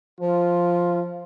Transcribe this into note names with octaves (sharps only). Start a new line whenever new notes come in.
F3 F4